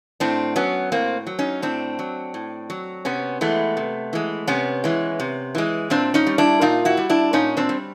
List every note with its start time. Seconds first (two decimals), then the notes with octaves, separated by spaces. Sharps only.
0.20 A2 C4 D4
0.56 F#3 B3 C#4
0.92 A2 A#3 C4
1.27 F#3
1.39 C#4 D#4
1.62 A2 C4 D4
1.99 F#3
2.34 A2
2.70 F#3
3.05 C3 B3 C#4
3.41 E3 G#3 A3 B3
3.77 C3
4.13 E3 G#3
4.47 C3 B3 C#4
4.84 E3 G#3
5.20 C3
5.55 E3 G#3
5.90 A#2 C4 D4
6.14 C#4 D#4
6.27 G3
6.38 D4 E4
6.61 A#2 D#4 F4
6.85 E4 F#4
6.97 G3
7.09 D4 E4
7.33 A#2 C#4 D#4
7.57 C4 D4
7.69 G3